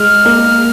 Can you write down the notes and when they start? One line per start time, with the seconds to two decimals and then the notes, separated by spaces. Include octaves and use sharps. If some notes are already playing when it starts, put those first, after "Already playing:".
Already playing: G#3 F6
0.25 A#3